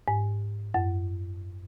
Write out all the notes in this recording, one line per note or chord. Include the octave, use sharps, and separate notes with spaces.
G#2
F#2